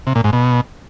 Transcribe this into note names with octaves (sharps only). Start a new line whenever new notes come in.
C3
A#2
G#2
B2